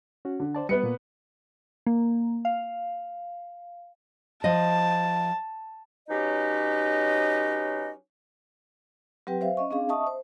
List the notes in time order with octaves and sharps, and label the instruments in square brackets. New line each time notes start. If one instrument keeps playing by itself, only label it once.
[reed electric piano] C#4 F#4
[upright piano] D3
[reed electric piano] C5 D5 A5
[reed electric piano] G3 [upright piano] B3 B4 C#7
[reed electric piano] A#2 A#3
[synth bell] A#3
F5
[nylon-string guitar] F3 D#5 [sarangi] A5
[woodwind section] F#3 C#4 D#4 G4 B4 D#5
[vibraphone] F#3 C4 G4 B4 G5
C5 E5 F5
C#4 D#5 C#6
C4 D4 G#4 F5
D#5 E5 A5 C#6 D#6
C5